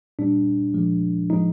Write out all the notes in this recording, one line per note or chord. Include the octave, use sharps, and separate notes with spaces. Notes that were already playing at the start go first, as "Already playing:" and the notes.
A#2 G3 D4
A#2 F3 G#3
A2 F3 G#3 D#4